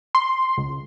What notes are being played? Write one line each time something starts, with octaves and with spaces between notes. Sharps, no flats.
C6
C#2